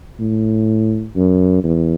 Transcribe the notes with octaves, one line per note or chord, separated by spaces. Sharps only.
A2
F#2
E2